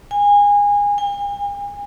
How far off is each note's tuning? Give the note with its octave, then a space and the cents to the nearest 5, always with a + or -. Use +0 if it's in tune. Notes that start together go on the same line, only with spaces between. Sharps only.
G#5 -25
G#5 -45